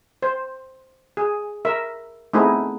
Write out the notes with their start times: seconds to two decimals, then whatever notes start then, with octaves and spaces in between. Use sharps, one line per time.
0.22 C5
1.17 G#4
1.65 A#4 E5
2.33 A3 B3 C4 D#4 E4 G#4